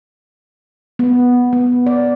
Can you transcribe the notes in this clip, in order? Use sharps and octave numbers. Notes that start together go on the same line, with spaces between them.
B3
B3
D5